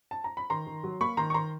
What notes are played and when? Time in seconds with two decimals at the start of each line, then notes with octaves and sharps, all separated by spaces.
0.11 A5
0.24 A#5
0.37 B5
0.50 D#3 A#5 C6
0.67 D#3
0.84 F#3
1.01 A#3 B5 C#6
1.17 D#3 A#5 C6
1.30 C#6
1.34 D#3 A#5 C6